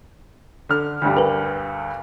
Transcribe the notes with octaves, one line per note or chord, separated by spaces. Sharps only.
D3 F6
D2 G2 G3
A#4 B4